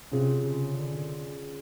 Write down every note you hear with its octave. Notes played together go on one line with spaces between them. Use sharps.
C3 C#4 F4 G#4
C#3
D3